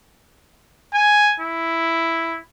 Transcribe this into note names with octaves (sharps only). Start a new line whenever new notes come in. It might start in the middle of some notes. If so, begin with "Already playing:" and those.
G#5
E4